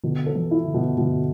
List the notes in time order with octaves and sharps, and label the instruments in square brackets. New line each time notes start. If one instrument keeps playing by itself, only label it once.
[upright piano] B2 [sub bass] D3
[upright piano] A4
[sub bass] E3
[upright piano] E4
[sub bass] D3
[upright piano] B2
[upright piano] B2 [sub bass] D3